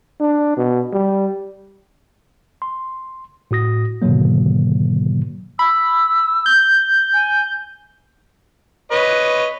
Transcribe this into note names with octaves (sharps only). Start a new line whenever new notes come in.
D4
B2
G3
C6
A2 F#4 D#6 A#6
G#2 B2 D3 D#3 F#3 A#3
B5 E6
G6
G#5
B4 C#5 D#5